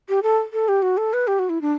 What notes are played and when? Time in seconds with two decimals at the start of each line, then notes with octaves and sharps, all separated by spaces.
0.09 G4
0.23 A4
0.53 A4
0.68 G4
0.82 F#4
0.97 A4
1.13 B4
1.27 G4
1.39 F#4
1.49 E4
1.61 D4